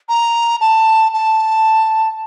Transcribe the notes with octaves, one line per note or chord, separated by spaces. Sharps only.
A#5
A5
A5